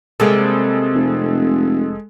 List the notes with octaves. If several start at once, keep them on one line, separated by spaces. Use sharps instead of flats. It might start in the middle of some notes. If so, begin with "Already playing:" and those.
C3 G3 G#3 A#3 G#4 A4
F1